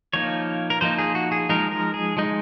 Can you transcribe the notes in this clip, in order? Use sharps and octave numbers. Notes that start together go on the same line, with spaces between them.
F3 A#3 D#4 C#5
A#4
F3 A#3 D#4 C5
G#4
F#4
G#4
F3 G#3 D#4 A#4
A#4
G#4
F3 G#3 D#4